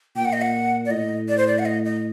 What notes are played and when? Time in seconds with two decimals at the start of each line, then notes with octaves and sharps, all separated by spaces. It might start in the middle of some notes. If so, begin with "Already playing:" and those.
0.16 A#2 G5
0.25 F#5
0.33 D#5
0.41 F#5
0.85 D5
0.90 A2 D#5
1.28 D5
1.37 C5
1.47 D5
1.59 F#5
1.65 D#5
1.85 D#5